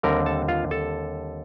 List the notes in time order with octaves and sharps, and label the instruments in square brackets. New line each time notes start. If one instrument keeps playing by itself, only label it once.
[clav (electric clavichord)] D#2 D3 G3 C4 A#4 A#5
A4 A5
F4 F5
A4 A5